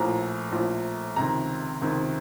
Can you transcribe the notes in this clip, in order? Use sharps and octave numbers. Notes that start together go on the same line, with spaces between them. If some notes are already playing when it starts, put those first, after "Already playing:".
Already playing: A#1 A2 F3 A#5
A#1 A2 F3
C#2 C3 D#3 A#5
C#2 C3 D#3